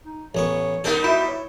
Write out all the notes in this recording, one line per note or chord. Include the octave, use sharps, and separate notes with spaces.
D#4
A1 B3 C#5 C#6
G3 B3 D#4 A4 A#4 F#5
E4 F#4 E5
C#5